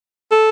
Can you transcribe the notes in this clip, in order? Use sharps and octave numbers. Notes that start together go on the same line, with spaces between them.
A4